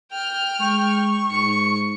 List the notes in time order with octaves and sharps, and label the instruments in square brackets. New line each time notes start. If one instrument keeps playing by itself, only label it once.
[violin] G5 F6
[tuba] G#3 [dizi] C#6
[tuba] G#2 [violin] C#7